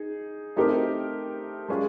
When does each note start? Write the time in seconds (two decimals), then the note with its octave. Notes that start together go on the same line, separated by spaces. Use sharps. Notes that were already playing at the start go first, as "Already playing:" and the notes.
Already playing: D#4 G#4
0.56 A3 C4 D#4 G4 A#4
1.68 G#3 C#4 F4 G#4